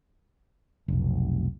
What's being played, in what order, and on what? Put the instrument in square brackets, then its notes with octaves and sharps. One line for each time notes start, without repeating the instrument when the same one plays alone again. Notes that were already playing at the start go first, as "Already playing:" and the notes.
[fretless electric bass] F1 B1